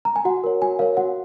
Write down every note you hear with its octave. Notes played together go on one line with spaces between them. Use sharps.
A#5
G#5
F#4 F#5
A#4 C#5
F#4 G#5
A#4 C#5 F5
F#4 F#5